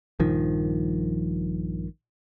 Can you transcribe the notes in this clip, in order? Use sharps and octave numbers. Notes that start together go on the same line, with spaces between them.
A#1 G2 D#3 F3